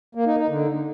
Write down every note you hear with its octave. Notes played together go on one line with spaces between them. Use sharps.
A#3
D#4
D#4
D3